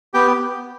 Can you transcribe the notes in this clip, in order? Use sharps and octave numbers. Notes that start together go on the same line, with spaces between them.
B3 G4 G5